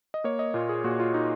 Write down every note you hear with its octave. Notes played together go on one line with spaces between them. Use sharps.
D#5
A#3 C#5
D#5
A#2 F4
G#4
A#2 F#4
F4
A#3 D#4